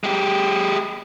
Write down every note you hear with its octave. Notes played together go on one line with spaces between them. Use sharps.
G#3 G4